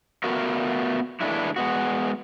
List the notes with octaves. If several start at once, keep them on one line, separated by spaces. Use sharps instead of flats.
A3 B3 F4 F#4 A#4
D3 E3 G#3 A3 D4 E4
G#3 B3 F#4